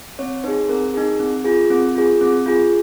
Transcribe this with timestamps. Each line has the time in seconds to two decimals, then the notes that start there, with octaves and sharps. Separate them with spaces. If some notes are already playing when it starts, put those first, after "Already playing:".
0.19 C4 C#5
0.44 D#4 G#4 C5
0.69 C4 A#4
0.94 D#4 G#4
1.19 C4
1.45 F4 G#4
1.70 C4
1.95 F4 G#4
2.21 C4
2.46 F4 G#4